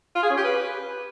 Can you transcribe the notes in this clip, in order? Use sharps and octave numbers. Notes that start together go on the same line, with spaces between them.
F4
G#4
C#4
G4
B4